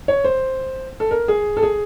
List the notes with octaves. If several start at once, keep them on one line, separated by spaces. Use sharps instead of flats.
C#5
C5
A4
A#4
G#4
A4
G#4